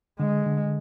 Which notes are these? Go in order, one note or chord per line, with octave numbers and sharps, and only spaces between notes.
D3 G#3
D3